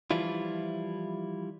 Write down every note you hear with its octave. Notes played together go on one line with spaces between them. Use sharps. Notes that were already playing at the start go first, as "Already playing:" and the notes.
E3 F3 G3 E4 F4